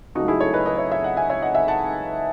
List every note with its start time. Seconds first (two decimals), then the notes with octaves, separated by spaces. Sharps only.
0.15 C#2 C#3 F#3 A3 D#4 F#4
0.28 E4 G#4
0.41 A4 C#5
0.54 B4 D#5
0.66 B4 D#5
0.78 C#5 E5
0.92 C#5 E5
1.04 D#5 F#5
1.17 E5 G#5
1.30 C#5 E5
1.42 D#5 F#5
1.55 E5 G#5
1.68 F#5 A5